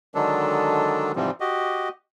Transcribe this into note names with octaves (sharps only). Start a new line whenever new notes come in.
D3 D#3 F#3 G#3 D4 A4
G#2 C3 E3 F3 G3 C4
F#4 G4 D#5